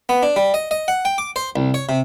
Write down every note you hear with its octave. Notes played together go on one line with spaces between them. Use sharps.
B3
D4
G3
D#5
D#5
F#5
G5
D6
C5
C2
C#5
C3